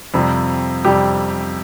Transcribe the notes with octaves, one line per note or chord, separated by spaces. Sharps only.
F2 C3 G3
F2 C3 G3 G4